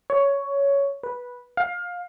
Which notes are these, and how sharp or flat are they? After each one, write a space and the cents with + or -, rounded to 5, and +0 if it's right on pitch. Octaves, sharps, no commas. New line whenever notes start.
C#5 +10
B4 -10
F5 +20